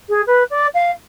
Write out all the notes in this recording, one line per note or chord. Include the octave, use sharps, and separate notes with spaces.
G#4
B4
D5
F5